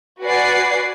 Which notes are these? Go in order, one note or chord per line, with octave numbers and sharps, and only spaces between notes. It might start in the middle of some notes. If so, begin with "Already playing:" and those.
F#4 B4 D5 F#5 G#5 C7